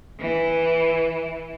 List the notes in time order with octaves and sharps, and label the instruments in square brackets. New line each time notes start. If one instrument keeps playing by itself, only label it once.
[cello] E3